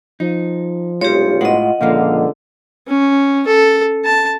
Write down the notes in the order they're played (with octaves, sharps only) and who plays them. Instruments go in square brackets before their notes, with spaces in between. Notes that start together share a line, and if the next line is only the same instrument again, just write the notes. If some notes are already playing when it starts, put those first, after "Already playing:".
[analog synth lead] F3 [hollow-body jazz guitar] D#4
[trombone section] B1 G2 C3 [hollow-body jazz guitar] G#3 [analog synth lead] F4 [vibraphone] G4 C#5
[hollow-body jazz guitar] A2 G#3 [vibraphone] D#5 F#5
[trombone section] C#2 D3 [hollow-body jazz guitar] A#2 F3 A#3 [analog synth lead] F5
[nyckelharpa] C#4
A4
A5